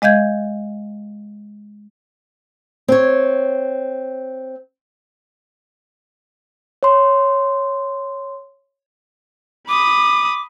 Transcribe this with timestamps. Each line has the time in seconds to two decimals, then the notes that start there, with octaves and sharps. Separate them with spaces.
0.02 G#3 D#5 F5 G6 G#6
2.88 C4 C#5
6.83 C#5 C6
9.68 B5 D6 D#6